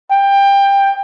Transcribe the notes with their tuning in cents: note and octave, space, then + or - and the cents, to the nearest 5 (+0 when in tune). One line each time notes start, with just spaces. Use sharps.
G5 +20